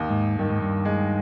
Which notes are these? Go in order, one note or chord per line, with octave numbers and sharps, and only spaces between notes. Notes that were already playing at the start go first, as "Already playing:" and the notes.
Already playing: D#2 D#4
G#2
G2 D#3
G#2
G2
G#3